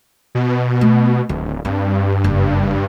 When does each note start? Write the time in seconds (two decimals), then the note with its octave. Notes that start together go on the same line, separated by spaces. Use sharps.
0.35 B2
0.81 A3
1.29 D1 D#3
1.65 G2 C4
2.24 F#1